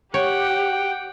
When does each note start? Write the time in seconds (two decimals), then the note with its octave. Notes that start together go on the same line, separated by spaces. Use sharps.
0.14 G4 C#5 F#5 G5